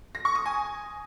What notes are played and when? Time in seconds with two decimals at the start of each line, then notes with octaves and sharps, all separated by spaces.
0.15 A#6
0.25 C#6
0.35 D#6
0.46 G#5